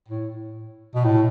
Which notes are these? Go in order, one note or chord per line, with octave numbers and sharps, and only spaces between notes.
A2
B2
A2